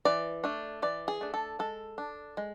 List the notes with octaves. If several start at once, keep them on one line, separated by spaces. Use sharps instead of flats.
E3 D5
A3 D4
E3 D5
G#4
A3 D4
A4
G#3 A4
D4
G#3